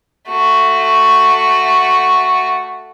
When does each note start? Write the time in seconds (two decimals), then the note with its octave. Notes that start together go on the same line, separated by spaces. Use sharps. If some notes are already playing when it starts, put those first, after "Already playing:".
0.29 A3 F#4